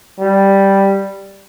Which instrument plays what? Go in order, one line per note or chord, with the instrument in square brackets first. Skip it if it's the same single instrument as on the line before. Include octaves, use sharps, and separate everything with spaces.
[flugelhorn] G3